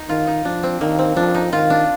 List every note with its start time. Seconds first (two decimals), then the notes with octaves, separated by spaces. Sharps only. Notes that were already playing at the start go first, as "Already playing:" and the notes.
Already playing: D#4
0.09 D#3 F4
0.27 D#4
0.45 F3 D4
0.63 C4
0.81 D#3 A#3
0.99 C4
1.16 F3 D4
1.34 D#4
1.52 D#3 F4
1.70 D4